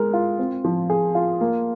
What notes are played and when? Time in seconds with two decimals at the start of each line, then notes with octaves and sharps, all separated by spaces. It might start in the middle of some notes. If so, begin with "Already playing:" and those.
Already playing: G#3 A#4
0.13 F4
0.39 C4
0.64 F3
0.90 G#4
1.15 F4
1.41 A#3